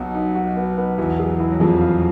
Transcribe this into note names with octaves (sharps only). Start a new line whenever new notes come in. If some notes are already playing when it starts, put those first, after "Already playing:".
Already playing: B1 B2 F#3 D#4
D#4
F#4
B3
B3
E2 E3 F#3
G#4
E4
F#3
F2 F3 G#4
F4